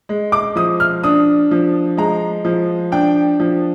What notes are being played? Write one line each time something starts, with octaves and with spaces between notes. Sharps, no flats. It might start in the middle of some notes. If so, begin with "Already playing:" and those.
G#3
D6
F3 D#6
F6
D4 D#6
F3
G#3 A#5
F3
D4 G5
F3